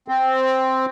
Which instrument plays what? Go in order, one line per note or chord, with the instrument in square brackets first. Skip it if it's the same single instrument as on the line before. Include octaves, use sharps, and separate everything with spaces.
[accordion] C4